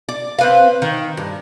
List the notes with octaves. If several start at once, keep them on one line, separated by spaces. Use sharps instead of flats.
D5
C4 B4 F5
D#3
G2